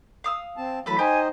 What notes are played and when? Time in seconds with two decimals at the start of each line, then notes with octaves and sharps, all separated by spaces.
0.24 F5 D#6 E6
0.57 C4 A5
0.86 E3 F#3 A3 A4 B4 B5
0.99 D#4 G4 C5 D#5 G#5